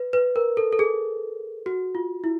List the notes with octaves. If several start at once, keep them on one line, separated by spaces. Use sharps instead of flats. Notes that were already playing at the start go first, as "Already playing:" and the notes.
Already playing: B4
B4
A#4
A4
A4
G#4
F#4
F4
E4